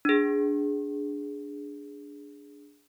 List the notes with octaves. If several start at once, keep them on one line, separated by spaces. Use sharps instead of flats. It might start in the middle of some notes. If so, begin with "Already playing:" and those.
D4 G#4